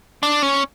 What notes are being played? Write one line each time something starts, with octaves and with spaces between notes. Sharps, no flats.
D4
C#4